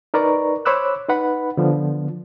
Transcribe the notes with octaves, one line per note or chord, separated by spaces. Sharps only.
D#4 A#4 B4 D5 A#5 C#6
C5 C#5 B5 D6 E6 F#6
D#4 B4 F#5 B5
D3 F3 B3